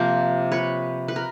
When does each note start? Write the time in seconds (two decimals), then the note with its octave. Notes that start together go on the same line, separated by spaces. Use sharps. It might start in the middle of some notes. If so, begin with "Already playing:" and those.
Already playing: C3 F3 A#3 A#4 C5
0.52 B4 C#5
1.08 B4
1.16 A#4